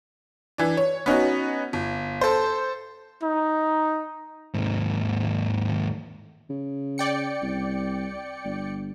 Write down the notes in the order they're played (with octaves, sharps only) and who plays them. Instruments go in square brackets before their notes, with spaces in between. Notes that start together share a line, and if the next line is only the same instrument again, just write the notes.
[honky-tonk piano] E3 D4
C#5
B3 C#4 D#4 F#4
G1
A4 C5
[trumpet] D#4
[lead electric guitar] D#2 G#2
[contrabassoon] C#3
[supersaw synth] D5 G5 C#7
[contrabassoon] C2
G1